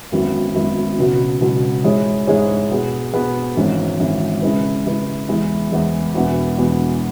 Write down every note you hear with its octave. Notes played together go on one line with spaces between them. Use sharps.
G#1 F#2 F#3 B3 E4
G#1 F#2 F#3 B3 E4
C#2 B2 F#3 B3 F#4
C#2 B2 F#3 B3 F#4
G#2 G#3 E4 G#4 C#5
G#2 G#3 E4 G#4 C#5
B2 B3 G#4
B2 B3 G#4
G#1 G#2 E3 C#4
G#1 G#2 E3 C#4
C#3 G#3 E4 B4
C#3 G#3 E4 B4
E2 E3 G#3 E4
E2 E3 G#3 E4
E1 E2 E3 B3 F#4
E1 E2 E3 B3 F#4